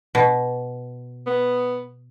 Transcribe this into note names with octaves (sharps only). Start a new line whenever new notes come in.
B2
B3